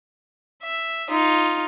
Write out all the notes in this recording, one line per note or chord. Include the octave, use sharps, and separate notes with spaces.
E5
D#4 F4